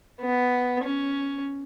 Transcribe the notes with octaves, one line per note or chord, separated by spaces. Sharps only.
B3
C#4